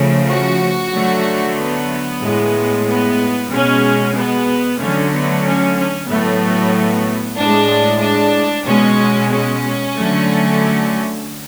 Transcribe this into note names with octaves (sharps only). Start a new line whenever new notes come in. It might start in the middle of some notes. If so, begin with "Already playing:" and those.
Already playing: C#3 F3 A3
F#4
D3 F#3 A3
B3
A2 G#3
B3
B2 G#3 C#4
B3
D3 F#3 A3 C#4
B3
C#4
C#4
A2 F#3 A3 B3
A2 G#3 D4
D4
B2 G#3 C#4
C#4
D3 F#3 A3